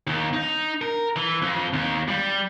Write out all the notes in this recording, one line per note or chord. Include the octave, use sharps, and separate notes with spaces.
D#2
D#4
A#4
E3
F2
D#2
G3